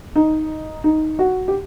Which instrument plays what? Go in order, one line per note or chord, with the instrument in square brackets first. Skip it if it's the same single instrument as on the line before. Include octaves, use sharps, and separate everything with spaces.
[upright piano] D#4
D#4
F#4
G4